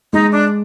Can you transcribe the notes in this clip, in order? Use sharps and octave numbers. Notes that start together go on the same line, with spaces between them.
G#3 D#4
D4